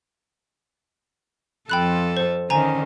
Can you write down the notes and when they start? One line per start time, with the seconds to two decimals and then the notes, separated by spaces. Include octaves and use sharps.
1.70 F2 F3 A4 G5 B5 F#6
2.17 C5
2.50 D3 D#3 C#4 C5 G#5 A#5